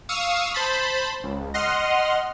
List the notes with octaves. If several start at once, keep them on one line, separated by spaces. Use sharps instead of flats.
F5 C#6 D#6 E6
C5 A5 B5
C#2
D#5 F#5 C6 F6